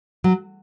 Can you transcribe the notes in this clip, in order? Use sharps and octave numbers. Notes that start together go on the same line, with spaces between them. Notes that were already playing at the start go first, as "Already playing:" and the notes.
F#3